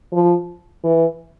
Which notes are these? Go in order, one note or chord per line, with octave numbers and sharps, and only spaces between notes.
F3
E3